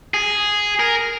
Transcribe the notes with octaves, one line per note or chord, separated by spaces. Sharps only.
G#4
A#4